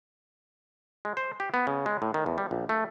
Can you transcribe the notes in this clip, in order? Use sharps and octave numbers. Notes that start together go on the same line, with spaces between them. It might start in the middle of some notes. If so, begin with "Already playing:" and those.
G#3
C5
G4
B3
C#3
G#3
A2
D#3
E2
G3
A#1
A3